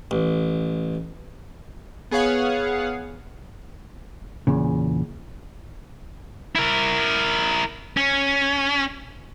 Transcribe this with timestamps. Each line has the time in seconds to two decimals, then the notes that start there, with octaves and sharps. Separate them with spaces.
0.11 A1
2.11 B3 G#4 C#5 F5 F#5
4.47 E2 A#2 C#3
6.56 E4 A#4
7.97 C#4